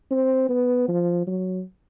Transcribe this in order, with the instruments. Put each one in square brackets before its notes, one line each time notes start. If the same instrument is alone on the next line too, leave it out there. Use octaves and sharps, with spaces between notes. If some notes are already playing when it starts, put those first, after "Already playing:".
[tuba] C4
B3
F3
F#3